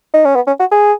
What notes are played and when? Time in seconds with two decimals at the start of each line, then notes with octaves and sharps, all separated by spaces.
0.14 D#4
0.25 C#4
0.35 B3
0.47 C#4
0.60 F#4
0.72 G#4